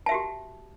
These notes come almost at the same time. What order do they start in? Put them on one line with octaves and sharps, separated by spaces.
A5 E5 F#4 G4